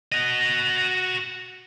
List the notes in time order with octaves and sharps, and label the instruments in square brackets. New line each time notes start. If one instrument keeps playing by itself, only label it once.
[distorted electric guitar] F#4 D#5